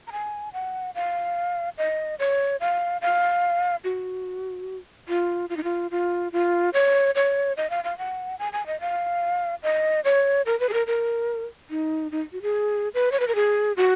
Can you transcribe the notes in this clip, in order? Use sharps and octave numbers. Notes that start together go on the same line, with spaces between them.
A#5
G#5
F#5
F5
D#5
C#5
F5
F5
F#4
F4
F4
D#4
F4
F4
F4
C#5
C#5
D#5
F5
F5
F#5
G#5
G#5
D#5
F5
D#5
C#5
A#4
B4
G#4
A#4
A#4
D#4
D#4
F#4
G#4
B4
C#5
B4
A#4
G#4
F#4